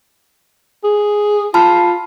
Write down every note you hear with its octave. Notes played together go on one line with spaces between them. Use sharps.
G#4
F4 A5 B5 F6